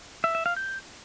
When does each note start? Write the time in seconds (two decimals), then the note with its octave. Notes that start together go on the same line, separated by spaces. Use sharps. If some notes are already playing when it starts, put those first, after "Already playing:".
0.24 E5
0.35 E5
0.46 F5
0.56 G6